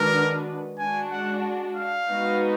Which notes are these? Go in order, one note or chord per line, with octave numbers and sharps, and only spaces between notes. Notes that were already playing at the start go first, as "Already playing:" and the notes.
Already playing: D#3 G#3 D4 F#4 A#4 B4
G#3 D4 F#4 G#5
F#5
F5
G#3 B3 D#4 F#4